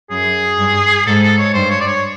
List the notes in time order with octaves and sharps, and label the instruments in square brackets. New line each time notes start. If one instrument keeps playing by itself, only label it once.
[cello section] F#2 [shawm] G#4
[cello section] G2
[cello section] G#2 [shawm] A4
[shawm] A4
C#5
[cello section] G2 [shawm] C5
[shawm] C#5
D5
C#5